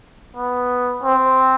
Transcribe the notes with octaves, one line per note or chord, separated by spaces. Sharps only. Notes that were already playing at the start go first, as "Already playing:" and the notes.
B3
C4